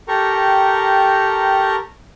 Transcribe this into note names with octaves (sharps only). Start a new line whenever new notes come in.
G4 A4 A#4 G5 A#5 C#6